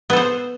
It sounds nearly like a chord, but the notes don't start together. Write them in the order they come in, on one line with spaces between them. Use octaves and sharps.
B3 A4 C5